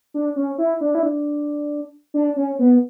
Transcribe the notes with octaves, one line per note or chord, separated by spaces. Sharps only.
D4
C#4
E4
D4
E4
D4
D4
C#4
B3